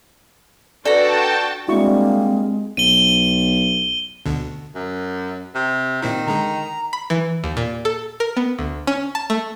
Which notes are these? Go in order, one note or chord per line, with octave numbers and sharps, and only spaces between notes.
D4 F#4 A4 B4 D5 G5 A5 A#5
G3 G#3 A#3 C4 D4 E4 F#4 C#6
B1 D#7 G7
D2 B2 D3
F#2
C3
A#2 D#3 C4 E4
D3 G#3 A#5
B5
E3
D#2
A#2
A4
A#4
B3
D2
C#4
A5
A3